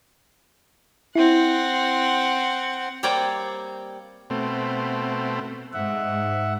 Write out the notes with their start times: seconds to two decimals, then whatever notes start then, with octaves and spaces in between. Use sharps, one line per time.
1.15 C4 E4 F#5
3.03 G3 A#3 C4 C#5 D5 G5
4.30 B2 A3 C4
5.73 G#2 E5 F#5